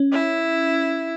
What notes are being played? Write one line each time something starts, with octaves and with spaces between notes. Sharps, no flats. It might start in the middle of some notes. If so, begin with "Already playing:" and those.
Already playing: C#4
E4